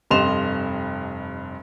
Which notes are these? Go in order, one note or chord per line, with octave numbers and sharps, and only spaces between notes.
F1 G2 D#5 C6 E7 F7